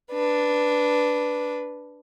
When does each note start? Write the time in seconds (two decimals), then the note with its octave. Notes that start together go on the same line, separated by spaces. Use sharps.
0.12 D4 B4